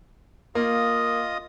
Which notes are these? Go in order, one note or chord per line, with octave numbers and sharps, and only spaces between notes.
A#3 F4 D#5 D#6